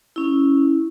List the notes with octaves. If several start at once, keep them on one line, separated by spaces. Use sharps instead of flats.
C#4 E4